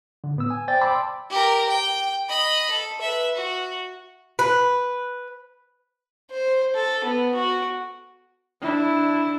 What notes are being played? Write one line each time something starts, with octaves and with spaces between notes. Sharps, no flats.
D3
A2 B3 E6
G#5
C5 D5 G5 A6
G5 A5 B5 C6 D6 E6
G4 A#4
G5
D#5 B5
A4
B4 E5
F#4
B4
C5
A4
B3
F#4
D4 E4